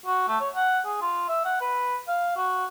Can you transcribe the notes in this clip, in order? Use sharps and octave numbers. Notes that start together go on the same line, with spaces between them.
F#4
A3
C#5
F#5
G#4
F4
E5
F#5
B4
F5
F#4